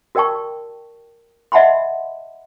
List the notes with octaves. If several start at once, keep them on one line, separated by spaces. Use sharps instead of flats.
F#4 A#4 D5 G5 A5 C#6
D#5 E5 F#5 A5 B5 C6